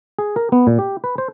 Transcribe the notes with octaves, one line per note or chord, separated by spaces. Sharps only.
G#4
A#4
B3
A#2
G4
B4
C5